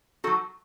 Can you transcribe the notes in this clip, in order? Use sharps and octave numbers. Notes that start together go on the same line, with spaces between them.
F#3 C4 D#4 F#4 A4